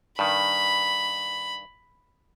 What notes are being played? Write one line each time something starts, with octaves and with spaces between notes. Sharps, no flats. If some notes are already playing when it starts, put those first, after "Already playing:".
G2 D#3 B5